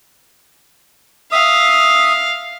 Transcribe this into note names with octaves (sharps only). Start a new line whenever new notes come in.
E5 F5 D#6